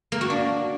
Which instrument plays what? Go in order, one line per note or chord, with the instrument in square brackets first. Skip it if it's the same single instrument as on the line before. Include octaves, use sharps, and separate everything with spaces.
[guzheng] A#3
F#4
D4